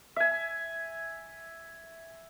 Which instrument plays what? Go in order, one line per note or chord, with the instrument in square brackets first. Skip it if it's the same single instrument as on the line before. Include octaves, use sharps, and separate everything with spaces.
[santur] E5 G#5